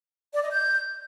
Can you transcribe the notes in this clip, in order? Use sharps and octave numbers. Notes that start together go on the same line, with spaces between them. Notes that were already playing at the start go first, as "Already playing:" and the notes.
D5
D#5
G6